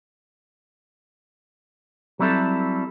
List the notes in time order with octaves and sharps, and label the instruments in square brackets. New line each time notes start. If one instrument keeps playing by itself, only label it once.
[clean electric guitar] F#3 G3 C4 E4 A4